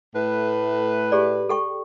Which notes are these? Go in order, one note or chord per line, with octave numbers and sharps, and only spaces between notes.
A2 A3 B4
G4 G#4 D5
A4 G5 C#6